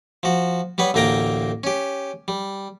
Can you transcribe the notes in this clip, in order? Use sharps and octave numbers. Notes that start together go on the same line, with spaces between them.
F3 F#4
G3 B3 B4 C#5
A1 D2 A#3 A#4 G5 A#5
C#4 G4
G3